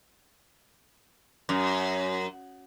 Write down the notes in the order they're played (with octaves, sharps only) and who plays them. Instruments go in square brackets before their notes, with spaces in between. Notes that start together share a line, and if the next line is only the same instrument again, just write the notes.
[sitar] F#2